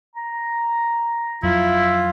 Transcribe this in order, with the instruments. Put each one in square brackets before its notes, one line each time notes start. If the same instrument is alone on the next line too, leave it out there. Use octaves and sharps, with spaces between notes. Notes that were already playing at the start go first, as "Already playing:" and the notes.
[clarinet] A#5
[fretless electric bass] F2 F#3 [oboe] E4 [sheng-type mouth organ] F4